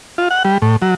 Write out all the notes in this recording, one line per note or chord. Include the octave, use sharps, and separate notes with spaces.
F4
F#5
G3
A2
F#3